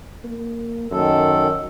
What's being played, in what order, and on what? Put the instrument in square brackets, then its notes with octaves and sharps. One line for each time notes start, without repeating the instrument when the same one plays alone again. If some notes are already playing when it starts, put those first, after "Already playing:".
[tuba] A#3
[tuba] F#2 [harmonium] D#3 A4